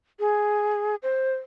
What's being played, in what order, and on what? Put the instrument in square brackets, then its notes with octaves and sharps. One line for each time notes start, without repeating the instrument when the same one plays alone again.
[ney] G#4
C5